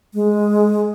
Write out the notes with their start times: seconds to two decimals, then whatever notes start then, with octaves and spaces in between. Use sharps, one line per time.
0.14 G#3